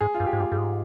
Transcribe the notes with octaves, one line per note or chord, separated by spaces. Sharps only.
G#2 G#4
F4
G2
G4
G#2
G2 G4
G2 G#4
G#2